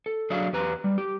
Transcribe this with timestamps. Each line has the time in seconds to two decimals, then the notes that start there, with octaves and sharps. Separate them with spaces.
0.06 A4
0.30 F#3 D4 G#4 E5 F5
0.53 E2 G4 B4 A#5
0.84 G3
0.98 G4